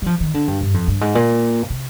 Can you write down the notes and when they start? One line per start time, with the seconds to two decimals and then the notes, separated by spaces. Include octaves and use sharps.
0.02 G3
0.06 F3
0.20 D#3
0.34 D3
0.48 G2
0.61 G2
0.74 F2
0.88 G2
1.01 G#2
1.15 A#2
1.70 C3